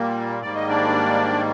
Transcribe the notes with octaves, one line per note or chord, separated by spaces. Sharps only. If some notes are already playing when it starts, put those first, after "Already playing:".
Already playing: A#2 G3 A#3
G#2 D#3 G3 A#3 D5
D#5
D4 D5